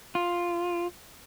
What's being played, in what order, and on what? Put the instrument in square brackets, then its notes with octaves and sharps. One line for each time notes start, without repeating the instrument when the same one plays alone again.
[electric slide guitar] F4